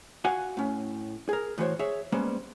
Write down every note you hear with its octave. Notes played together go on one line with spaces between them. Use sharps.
F#4 F5 F#5 G#5
A2 C#4
G#4 A#4
A2 E3 F#4 C5 C#5
G#4 C#5 E5
G3 G#3 A#3 B3 C#4 C5